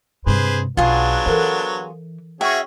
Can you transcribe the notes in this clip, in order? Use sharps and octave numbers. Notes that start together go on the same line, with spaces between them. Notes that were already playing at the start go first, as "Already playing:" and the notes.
G2 C3 G#4 B4 C5
B1 F#3 B3 D4 F4 G#4
E3 A4 A#4 C5
C#4 F#4 G#4 E5 G5 C#6